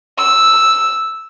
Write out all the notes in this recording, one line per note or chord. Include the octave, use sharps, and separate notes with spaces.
E6